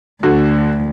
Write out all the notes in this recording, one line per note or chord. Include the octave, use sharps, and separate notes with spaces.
D2 D3 F#4